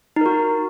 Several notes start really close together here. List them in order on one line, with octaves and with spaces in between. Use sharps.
D#4 A#4 F#4